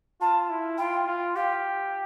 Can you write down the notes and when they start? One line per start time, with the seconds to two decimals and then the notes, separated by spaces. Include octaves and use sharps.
0.21 F4 A5
0.50 E4
0.78 F4 G5
1.07 F4
1.36 G4 F5